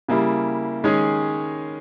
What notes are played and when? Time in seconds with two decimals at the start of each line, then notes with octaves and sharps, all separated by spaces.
0.08 C#3 G3 A#3 E4
0.84 D#3 G#3 C#4 G#4